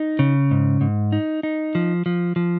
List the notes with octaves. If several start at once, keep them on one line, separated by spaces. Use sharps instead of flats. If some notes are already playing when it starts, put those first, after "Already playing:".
Already playing: D#4
C#3
G#2
G#2
D#4
D#4
F3
F3
F3